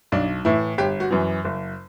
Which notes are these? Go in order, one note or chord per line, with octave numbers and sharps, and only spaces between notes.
B1 D4
A2 E3 E4
G1 G4
F#4
F#2 E3
F#1